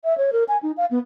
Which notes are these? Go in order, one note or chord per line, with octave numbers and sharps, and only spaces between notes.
E5
C#5
A#4
G#5
D#4
F5
B3